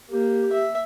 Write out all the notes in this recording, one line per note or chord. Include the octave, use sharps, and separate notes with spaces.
A#3 G4
E5